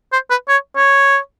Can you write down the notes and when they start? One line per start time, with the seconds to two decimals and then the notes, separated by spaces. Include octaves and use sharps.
0.13 C5
0.30 B4
0.48 C#5
0.76 C#5